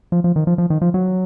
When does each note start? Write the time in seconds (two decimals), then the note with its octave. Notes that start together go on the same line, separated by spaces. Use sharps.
0.12 F3
0.24 F3
0.36 D#3
0.47 F3
0.58 F3
0.70 D#3
0.82 F3
0.94 F#3